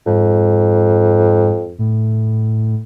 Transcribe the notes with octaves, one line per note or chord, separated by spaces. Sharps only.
F2 G#2
A2